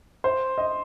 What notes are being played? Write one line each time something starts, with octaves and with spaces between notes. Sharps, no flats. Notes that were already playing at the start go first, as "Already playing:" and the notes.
C5
D#5